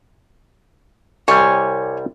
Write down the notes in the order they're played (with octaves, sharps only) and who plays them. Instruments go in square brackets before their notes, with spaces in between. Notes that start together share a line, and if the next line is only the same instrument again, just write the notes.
[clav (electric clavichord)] C2 C3 G3 [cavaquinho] C#5 G#5